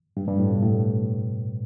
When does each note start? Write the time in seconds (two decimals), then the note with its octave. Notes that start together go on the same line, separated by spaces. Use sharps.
0.17 G2
0.28 G2
0.39 A2
0.51 B2
0.63 A2